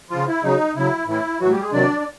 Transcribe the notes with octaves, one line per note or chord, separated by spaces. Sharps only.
C#3 F3 F4
E4
C#3 F#3 D#4
C#3 F#3 E4
A2 E3 E4
A2 E3 F#3 F#4
G3 G4
G#3 G#4
C3 D#3 F#3 D4 D5
D5